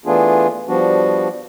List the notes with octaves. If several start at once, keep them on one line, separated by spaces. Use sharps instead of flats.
E3 A3 B3 D4 F4 G#4
F3 G3 B3 D4 F#4